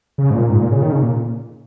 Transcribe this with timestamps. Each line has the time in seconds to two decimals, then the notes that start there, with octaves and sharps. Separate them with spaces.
0.18 C#3
0.30 G#2
0.34 A#2
0.50 G#2
0.61 A#2
0.72 C#3
0.82 D#3
0.92 C#3
1.02 A#2